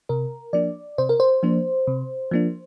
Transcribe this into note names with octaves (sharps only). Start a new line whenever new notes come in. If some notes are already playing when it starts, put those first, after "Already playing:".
C3 A#4
F3 A#3 D4 D5
C3 C5
A#4
C5
F3 A#3 D4
C3
F3 A#3 D4